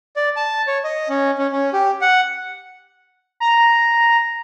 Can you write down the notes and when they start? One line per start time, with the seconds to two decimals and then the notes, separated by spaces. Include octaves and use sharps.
0.16 D5
0.36 A5
0.67 C#5
0.84 D#5
1.09 C#4
1.38 C#4
1.52 C#4
1.73 G4
2.01 F#5
3.40 A#5